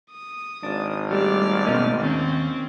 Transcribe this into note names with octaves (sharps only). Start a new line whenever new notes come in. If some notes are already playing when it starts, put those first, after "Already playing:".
D#6
G#1 D4
G3 A3 D4 D5 F6
B2 A3 A#3 C#4 D#5
D#2 D#3 C4 C#4 A6